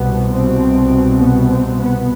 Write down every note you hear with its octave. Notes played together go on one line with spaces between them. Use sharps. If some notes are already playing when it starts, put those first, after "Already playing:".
Already playing: C2 B2 B3
C4
B3
C4
B3